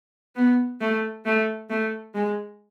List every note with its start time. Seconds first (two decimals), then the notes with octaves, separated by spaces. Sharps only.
0.36 B3
0.81 A3
1.25 A3
1.70 A3
2.15 G#3